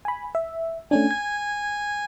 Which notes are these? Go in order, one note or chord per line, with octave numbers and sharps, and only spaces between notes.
G#5 B5
E5
A3 C#4 D4 G#5
G#6